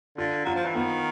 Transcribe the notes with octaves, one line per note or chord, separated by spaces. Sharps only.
D3 F4
F#3 F4
F3
E3
D#3 B3